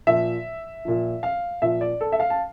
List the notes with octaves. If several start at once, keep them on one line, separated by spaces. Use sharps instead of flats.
A#2 F3 E5
A#2 F3
F5
A#2 F3 E5
D5
A4
E5
F5
A5